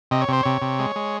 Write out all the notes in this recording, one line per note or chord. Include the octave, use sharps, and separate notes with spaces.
C3 D#5
C#5
C3 C5
C3 C#5
C3
G#3
G#3